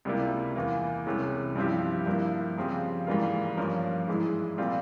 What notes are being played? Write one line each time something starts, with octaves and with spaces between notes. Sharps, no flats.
C#2 C3 G3 A#3 E4
E2 E3 A#3 F4
C2 C3 E3 G#3 C#4
G2 F3 C4 E4 G4
G2 F3 A#3 E4
C#3 F3 C4 G4
G#2 E3 G3 A#3 F4
G2 F3 A#3 C#4 F4
G#2 E3 G#3 E4
A#2 G3 C4 F4